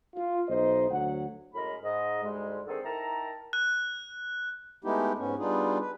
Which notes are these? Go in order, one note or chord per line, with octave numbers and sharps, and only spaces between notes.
F4
B1 D#4 C5 D#5
D2 F#3 F#5
F#2 A2 G#3 A#4 B5
G#2 D#5
D2 G#2 G3 G#3
D3 D#3 C4 G#4 A4
D#4 E4 A#4 G5 A5 A#5
F#6
G#3 A3 B3 D#4 E4 G4
G#2 B3 C#4
G3 B3 D4 D#4 F4 G#4
B4